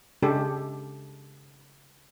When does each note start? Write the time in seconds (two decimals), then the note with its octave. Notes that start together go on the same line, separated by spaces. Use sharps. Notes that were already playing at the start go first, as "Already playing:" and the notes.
0.22 C#3 G#3 D4 G4 A4